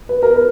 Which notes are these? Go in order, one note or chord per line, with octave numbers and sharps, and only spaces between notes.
B4
A#4
B4